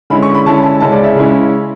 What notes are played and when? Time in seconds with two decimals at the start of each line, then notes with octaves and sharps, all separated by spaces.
0.10 D3 G#3 C#4 E4 B5
0.22 C#6
0.35 B5
0.46 D3 G#3 C#4 E4 A5
0.63 A5
0.80 C#3 G#3 C#4 E4 A5
0.92 D5
1.04 E5
1.15 C#3 G#3 C#4 E4